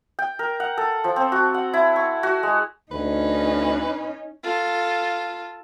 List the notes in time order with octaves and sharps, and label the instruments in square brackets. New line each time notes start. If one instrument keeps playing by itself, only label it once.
[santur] G5
A#4
F#5
A4
F3
C4
F#4
F#5
E4
C#6
F#4
G#3
[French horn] D2 [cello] C#4 D#4 [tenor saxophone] B4
[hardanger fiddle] F4 A4